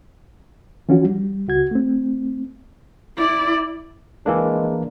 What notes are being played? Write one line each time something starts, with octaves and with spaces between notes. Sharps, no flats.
E3 F3 C#4 D4 F4 F#4
G3
C#2 F#4 G#6
A3 C4
E4 D5
E3 G#3 A#3 D4